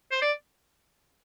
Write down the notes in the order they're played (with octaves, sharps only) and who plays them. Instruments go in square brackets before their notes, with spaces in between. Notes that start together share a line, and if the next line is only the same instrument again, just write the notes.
[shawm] C5
D5